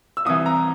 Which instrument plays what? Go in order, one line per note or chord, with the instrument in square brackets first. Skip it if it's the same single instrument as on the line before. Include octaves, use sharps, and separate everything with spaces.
[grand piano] E6
C2 C3 E3 D#6
A#5